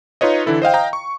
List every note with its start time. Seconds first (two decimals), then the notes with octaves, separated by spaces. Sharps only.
0.21 D#4 F4 B4 C#5 D#5
0.46 D3 E3 E4 A4
0.62 C5 D#5 F5 G5
0.74 D#5 F5 G5 A#5
0.93 C#6